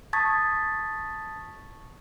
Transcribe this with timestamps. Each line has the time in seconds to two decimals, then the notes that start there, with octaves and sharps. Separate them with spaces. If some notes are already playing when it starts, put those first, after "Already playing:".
0.13 A5 C#6 D#6 G#6 A6 B6